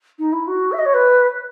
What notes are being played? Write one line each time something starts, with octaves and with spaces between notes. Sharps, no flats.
D#4
E4
F#4
E5
D#5
C#5
B4